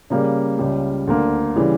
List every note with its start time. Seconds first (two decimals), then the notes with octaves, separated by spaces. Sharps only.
0.10 C#3 G3 A#3
0.59 C#2 C#3 G3
1.07 D2 D3 A#3
1.56 C#3 E3 G3